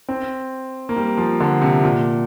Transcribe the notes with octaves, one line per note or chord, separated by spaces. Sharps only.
C4
A#3
G3
F3
D3
C3
A#2